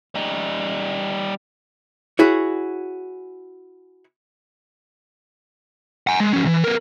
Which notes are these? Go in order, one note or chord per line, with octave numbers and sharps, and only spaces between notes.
G3 D#4
E4 F#4 G#4 C#5
F#5 G#5
G#3
F3 C#4
C#2 E3
B3 A#4